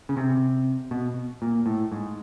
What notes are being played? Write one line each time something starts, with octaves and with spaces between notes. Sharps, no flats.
C#3
C3
B2
A#2
A2
G#2